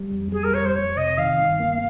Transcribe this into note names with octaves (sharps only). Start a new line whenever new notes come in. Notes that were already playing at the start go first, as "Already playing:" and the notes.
Already playing: G3
F2
G3 G#4
A#4
F2 C#5
C5
F2 C#5
C3 D#5
D#3 F5
G2
A#3